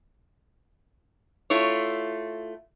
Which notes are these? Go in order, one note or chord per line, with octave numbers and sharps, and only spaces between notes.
A3 E4 F4 C#5